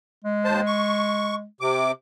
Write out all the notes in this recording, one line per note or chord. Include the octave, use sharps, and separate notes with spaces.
G#3
D#2 C5 A5
C#6
C3 D6